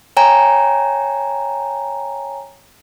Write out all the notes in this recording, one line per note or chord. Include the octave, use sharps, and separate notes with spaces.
C#5 G5 G#5 A#5